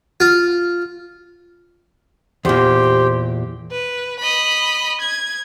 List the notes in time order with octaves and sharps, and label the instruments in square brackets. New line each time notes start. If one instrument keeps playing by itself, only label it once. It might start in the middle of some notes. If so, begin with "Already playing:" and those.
[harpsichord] F4
[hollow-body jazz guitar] E2 A#2 [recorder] G4 [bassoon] C5
[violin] B4
D#5 B5
G#6